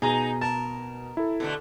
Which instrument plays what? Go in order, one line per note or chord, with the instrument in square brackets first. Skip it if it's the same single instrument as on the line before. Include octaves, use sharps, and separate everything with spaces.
[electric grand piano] B2 [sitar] D#4 [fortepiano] G#4 A#5
[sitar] A#4 [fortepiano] A5
[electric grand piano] E4 A4
[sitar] B2 D3 A3 [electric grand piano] A4